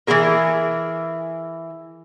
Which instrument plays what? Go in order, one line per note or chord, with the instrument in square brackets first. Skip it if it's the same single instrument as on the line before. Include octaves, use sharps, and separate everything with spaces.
[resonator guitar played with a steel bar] E3 C#4 E4 G#4 A#4